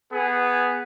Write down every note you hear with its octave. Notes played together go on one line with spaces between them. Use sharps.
B3 G#4